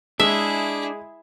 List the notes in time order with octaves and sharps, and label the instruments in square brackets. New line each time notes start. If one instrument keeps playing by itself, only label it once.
[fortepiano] G#3 [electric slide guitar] D4 [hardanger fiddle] E4 G#4 [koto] E5